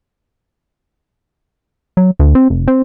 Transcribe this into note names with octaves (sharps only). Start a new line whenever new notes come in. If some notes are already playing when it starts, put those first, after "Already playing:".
F#3
D2
C4
F1
C4